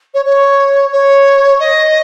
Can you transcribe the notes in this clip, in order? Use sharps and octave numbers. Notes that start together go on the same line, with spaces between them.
C#5
C#5
C#5
D#5